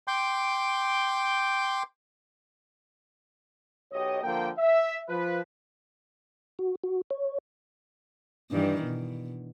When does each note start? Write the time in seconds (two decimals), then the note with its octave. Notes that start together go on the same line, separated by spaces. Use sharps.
0.08 G5 C6 D6 G6
3.92 B1 G4 C#5 D#5
4.24 D3 F3 A#3 G5
4.58 E5
5.09 F3 B4
6.59 F#4
6.84 F#4
7.10 C#5
8.52 G2 D#3 E3
8.83 B2